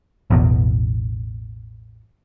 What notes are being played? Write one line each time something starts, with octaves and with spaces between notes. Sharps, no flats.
A1 E2 B2